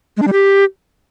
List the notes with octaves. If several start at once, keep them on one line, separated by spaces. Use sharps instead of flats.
G#3
D4
G3
G4